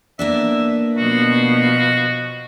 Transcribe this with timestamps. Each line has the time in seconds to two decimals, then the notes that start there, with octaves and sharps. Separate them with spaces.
0.19 A#3 B3 D4 E5
0.98 B2 F3 F#4